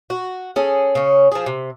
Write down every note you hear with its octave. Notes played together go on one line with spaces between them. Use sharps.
F#4
C#4 G#4 A4
C#3 C#4
F3 G#4
C3